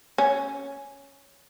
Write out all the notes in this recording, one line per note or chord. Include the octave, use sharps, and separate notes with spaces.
C#4